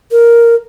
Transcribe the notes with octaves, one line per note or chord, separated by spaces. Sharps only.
A#4